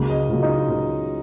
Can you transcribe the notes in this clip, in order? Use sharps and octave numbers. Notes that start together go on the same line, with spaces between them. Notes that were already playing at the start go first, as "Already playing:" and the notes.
Already playing: C#2 C#3 F#3 A#3
D#5
C#2 C#3 F#3 A#3 F4
D#4
F4
C#2 C#3 F#3 A#3